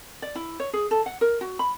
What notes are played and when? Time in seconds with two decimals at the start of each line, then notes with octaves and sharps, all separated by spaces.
0.22 D5
0.35 E4
0.60 C#5
0.73 G#4
0.91 A4
1.06 F#5
1.21 A#4
1.41 F#4
1.59 B5